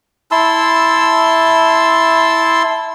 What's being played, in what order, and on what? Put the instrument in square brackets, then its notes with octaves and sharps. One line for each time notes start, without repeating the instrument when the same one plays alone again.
[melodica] E4 A5 C6 E6